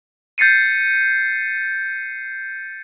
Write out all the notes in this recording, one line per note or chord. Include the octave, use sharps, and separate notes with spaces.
G6 A6 C7 C#7 D#7